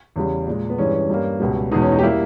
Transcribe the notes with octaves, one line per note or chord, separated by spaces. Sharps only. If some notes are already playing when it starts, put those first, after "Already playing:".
E2 C#3 G3
A#2 G#3
B3
G2 E3 G#3 C#4
C#4
G2 G3 A#3
C#2 B2 G3
E2 B2 G#3 D#4
C#4
D#4
G4
G3 A#3 E4